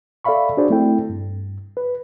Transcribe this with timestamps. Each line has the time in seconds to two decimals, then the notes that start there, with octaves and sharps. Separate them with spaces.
0.24 A4 D5 E5 F5 B5 C#6
0.57 D4 F#4 G#4 C5 D5
0.70 A3 C4 E4 A4 G5
1.09 G2
1.77 B4